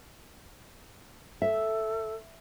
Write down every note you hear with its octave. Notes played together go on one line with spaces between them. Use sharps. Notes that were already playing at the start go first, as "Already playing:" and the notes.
A4 E5